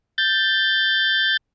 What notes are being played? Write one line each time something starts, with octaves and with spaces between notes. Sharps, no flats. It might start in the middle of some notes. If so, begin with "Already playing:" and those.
G6 A6